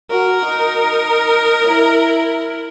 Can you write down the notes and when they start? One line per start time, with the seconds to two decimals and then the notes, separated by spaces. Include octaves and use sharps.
0.10 F#4 A#4
0.45 D#4
1.65 E4